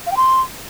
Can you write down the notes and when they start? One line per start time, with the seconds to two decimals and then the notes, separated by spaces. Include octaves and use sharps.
0.06 F5
0.12 G5
0.17 C6